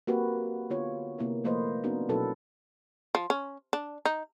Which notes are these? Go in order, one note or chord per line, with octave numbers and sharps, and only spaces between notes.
A#3 C4 F#4 G4 B4
D3 B3 F4 C#5
C3 A#3 B3 E4 A#4
F3 A3 A#3 B4 C5 D#5
B3 C4 D4 D#4 F#4 A#4
B2 F#3 C#4 E4 A4 B4
F3
C#4
D4
D#4